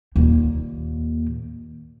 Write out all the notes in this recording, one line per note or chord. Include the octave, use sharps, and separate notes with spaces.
D#2 A#2